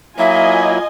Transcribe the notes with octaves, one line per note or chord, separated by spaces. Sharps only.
F#3 A#3 E4 F4 D#5 E5 G#5